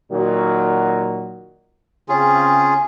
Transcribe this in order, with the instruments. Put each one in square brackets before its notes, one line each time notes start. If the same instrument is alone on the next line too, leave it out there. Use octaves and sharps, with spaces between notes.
[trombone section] A#2 D#3 F#3
[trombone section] C#3 C4 [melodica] C#4 F4 G#4